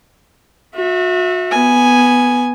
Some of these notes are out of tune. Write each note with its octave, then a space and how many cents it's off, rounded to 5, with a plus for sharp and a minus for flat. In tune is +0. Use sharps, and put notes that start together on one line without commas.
F#4 -35 E5 +0
B3 +0 G#5 +0